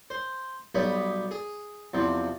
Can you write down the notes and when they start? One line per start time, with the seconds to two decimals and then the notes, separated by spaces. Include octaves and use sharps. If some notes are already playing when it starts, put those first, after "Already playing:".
0.10 C5
0.75 B1 G3 B3 C#5 B5
1.31 G#4
1.94 E2 C3 F3